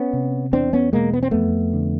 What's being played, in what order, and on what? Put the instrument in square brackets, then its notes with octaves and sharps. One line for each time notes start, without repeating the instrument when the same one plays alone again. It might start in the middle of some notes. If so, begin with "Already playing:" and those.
Already playing: [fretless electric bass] B3 C#4
C3
E2 C4 D4
B3 C#4
B2 G#3 A#3
B3
C4
F2 A3 B3
D3